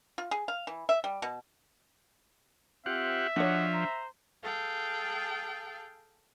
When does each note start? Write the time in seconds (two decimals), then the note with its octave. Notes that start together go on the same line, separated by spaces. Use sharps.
0.18 F4
0.31 G#4
0.48 F5
0.67 E3
0.89 E5
1.04 G3
1.22 B2
2.86 C4 F4 G4 E5 F#5
3.36 F3 D4 F#4 C#5 D#5 F#5
3.74 C5 A#5
4.42 G#4 A4 F5 G5